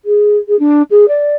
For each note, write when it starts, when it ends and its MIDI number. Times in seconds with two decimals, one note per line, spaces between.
0.05 0.37 68
0.48 0.58 68
0.59 0.82 62
0.90 1.05 68
1.08 1.36 74